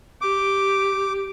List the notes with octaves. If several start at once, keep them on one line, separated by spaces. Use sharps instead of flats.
G4 D6